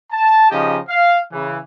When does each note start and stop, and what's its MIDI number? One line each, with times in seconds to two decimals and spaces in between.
0.11 0.50 81
0.51 0.77 49
0.51 0.77 53
0.51 0.77 63
0.51 0.77 67
0.51 0.77 75
0.89 1.18 77
1.32 1.59 49
1.32 1.59 52